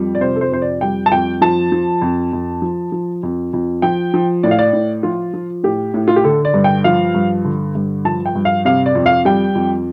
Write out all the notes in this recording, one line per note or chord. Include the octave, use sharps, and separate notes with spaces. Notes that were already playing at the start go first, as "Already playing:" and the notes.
Already playing: F2 G3
D5
C3 C5
A4
C5
F2 C5
D5
G3 G5
A5
F2 G5
F3 A5
F3
F2
F2
F3
F3
F2
F2
F3 G5
F3
A2 D5
F5
D5
A2
F3 F4
F3
A2 G4
A2
F4
G4
D3 A4
D5
G2
G5
F3 F5
G2
D3
G2
F3 A5
G5
G2
F5
C3 F5
D5
F2
F5
G3 G5
F2